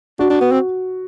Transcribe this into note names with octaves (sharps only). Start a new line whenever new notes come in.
D4 F#4
D4
B3
C4